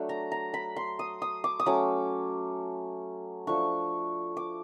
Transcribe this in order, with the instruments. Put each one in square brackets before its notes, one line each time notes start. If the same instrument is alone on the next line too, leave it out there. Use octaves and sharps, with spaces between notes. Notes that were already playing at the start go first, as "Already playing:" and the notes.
Already playing: [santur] F#3 A3 D4
A#5
A#5
B5
C6
D#6
D#6
D6
D#6
F#3 A3 C#4 D6
F3 A3 D4 C#6
D6